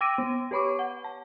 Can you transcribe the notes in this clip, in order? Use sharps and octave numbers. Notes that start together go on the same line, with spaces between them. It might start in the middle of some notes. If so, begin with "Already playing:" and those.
G5 D6 E6 A#6 D7 D#7
B3
G4 B4 C#5 B5 C#6 D6
F#5
A5